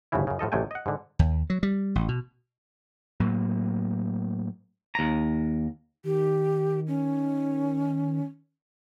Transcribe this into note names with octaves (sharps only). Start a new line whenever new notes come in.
G1 D2 A2 C#3 E3 E4
F#2 C#3
A2 F3 A4 D#5
A1 C3 F#3 A3 G5 G#5
D#5 F#5
G#2 D3
D#2
F#3
G3
A1
B2
A2 F#3 A#3
D#2 A#5
D#3 G4
C#4